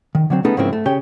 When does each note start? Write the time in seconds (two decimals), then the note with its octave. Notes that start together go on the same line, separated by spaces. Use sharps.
0.15 D#3
0.30 D3 F#3 C4
0.45 A3 B3 C#4 D#4 G#4 A4
0.57 G#2 C#3 F3 A#3 C4 E4
0.73 A3
0.86 C#3 G4 C#5 G5